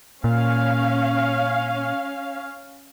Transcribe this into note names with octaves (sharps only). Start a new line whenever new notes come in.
A#2 C#4 F5